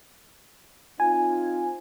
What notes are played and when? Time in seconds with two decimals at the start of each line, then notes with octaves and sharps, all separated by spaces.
1.00 C4 D#4 F4 G#5